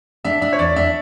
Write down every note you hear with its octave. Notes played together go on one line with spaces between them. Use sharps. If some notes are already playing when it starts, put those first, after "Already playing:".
D4 E5
D4 E5
C#5
E2 D5
D4 E5